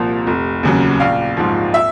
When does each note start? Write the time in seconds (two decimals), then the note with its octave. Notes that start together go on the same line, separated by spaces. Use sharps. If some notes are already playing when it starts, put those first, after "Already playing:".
Already playing: C2 A#2 F3
0.27 F1
0.63 D#2 C#3 F#3
1.00 A#1 F5
1.37 G#2 F3
1.74 E5